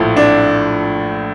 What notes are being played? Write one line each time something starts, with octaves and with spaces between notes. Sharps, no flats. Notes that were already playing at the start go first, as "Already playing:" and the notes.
Already playing: A#1 A2 F3 A3
D4